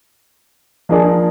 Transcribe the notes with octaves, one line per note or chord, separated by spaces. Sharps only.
F3 A#3 D4 G#4 D5